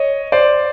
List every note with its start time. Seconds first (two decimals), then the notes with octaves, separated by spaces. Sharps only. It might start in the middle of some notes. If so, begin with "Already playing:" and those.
Already playing: C#5 D#5
0.32 C5 D5